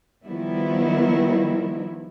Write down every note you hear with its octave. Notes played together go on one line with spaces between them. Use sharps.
D#3 F3 G3 B3 E4